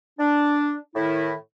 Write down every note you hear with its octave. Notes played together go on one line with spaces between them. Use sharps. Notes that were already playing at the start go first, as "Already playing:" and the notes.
D4
A2 D#3 E4